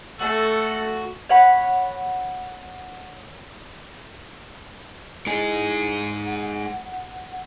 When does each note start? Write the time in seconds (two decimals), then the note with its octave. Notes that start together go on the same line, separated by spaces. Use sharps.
0.21 A3 F#4 A4
1.29 C#5 F#5 B5
5.27 G#3 D#4 E4 G#4
6.26 F#5